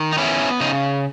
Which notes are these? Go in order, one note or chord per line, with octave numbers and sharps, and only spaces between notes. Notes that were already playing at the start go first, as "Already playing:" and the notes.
Already playing: D#3
D#4
B3 C#4 E4
C#3 D#4